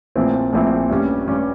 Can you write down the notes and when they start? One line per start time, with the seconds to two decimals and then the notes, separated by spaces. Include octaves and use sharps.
0.16 A#1 A#2 F3 C4 E4
0.53 A#1 A#2 F3 C4 E4
0.90 G2 G3 C#4
1.28 G2 G3 C#4